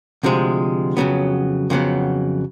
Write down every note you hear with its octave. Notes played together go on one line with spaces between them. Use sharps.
D2 C3 F3 G#3
F2 C#3 F#3 B3
F2 C#3 F#3 B3